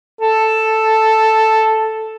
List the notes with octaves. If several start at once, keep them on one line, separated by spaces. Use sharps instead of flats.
A4